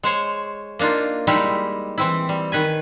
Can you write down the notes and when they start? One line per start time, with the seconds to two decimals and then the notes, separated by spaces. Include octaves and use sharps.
0.03 G#3 C5 C#5
0.79 A#3 D4 D#4 F4
1.27 G3 G#3 D#4 E4 G4
1.98 E3 C4 E4
2.29 G3
2.52 D#3 B4 G#5